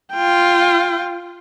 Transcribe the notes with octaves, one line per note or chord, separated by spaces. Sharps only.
F4 G5